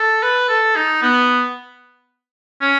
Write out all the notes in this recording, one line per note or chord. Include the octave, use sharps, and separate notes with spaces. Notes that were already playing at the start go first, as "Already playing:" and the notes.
Already playing: A4
B4
A4
D#4
B3
C#4